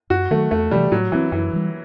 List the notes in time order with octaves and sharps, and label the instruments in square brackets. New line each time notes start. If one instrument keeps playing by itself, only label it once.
[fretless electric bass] F#2 [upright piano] F#4
[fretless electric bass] D#3 F#3 [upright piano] A3
[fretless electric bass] E2 [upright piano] A3
[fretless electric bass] C3 E3 [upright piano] G3
[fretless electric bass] A2 [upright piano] F#3
[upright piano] E3 [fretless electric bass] F#3 C4
[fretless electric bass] F#2 [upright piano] E3
[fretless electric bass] E3 G3